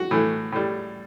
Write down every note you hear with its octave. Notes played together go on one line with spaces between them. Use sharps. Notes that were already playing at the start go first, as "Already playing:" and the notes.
Already playing: F#4
A2 E3 A3
A2 G3